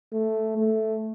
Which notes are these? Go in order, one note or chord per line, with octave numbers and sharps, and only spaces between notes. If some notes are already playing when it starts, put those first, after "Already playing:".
A3
A3